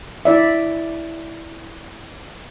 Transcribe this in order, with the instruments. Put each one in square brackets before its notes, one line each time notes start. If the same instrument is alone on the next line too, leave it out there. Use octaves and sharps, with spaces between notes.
[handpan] E4 D5 E5